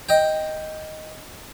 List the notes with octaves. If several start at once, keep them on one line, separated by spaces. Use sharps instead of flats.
D#5 G5